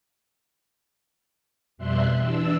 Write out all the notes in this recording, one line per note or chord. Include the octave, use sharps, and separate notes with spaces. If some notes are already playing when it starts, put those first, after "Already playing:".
F2 B2 G3 E5 C6 F#6
E3 D4 E6